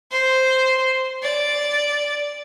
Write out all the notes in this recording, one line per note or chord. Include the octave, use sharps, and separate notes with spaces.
C5
D5